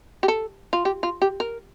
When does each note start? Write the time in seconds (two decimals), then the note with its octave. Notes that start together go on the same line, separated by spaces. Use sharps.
0.23 G4
0.28 A4
0.73 F4
0.85 G4
1.03 F4
1.22 G4
1.40 A#4